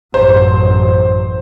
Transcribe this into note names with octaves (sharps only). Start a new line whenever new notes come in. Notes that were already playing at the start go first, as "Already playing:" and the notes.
A1 F#2 C5